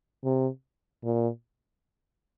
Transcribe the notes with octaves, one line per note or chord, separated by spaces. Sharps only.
C3
A#2